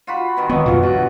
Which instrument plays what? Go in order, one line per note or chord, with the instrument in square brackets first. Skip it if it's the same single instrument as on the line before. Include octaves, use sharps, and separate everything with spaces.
[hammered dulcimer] F4 F#4 B5
B2 D#3 A#4
[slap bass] D#3 B3 [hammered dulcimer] F#3 [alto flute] D#5
[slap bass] F#2 B2 [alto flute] F4
[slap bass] G2 [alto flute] F#4 [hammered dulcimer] A5